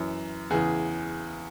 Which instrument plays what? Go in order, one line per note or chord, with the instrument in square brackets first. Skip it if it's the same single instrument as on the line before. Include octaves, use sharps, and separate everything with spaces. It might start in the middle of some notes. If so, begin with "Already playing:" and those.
Already playing: [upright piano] F#2 E3
E2 C#3 E3 G#4